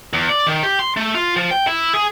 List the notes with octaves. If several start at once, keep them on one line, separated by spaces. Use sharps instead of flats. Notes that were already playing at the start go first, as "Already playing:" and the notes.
E2
D5
D#3
G4
C6
A3
F4
F3
G5
E4
G#4